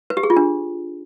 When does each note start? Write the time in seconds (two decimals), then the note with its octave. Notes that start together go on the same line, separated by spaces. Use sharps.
0.10 B4
0.17 G4
0.23 G#4
0.30 F4
0.37 D4